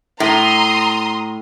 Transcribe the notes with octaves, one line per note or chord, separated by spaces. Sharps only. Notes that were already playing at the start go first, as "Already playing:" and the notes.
A2 A#5 C6 D#6